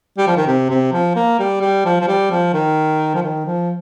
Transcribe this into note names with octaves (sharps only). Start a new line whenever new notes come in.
G3
F3
D#3
C3
C3
F3
A#3
G3
G3
F3
F3
G3
F3
D#3
F3
D#3
F3